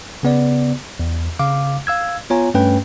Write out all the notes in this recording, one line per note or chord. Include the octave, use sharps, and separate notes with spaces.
C#3 B3 D5
E2
C#3 F5 D6
F5 E6 G#6
B3 F4 C#5 G#5 A#5
G2 A3 C#4 B4 G5